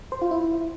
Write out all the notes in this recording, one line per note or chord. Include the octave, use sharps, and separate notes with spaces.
C5
F4
E4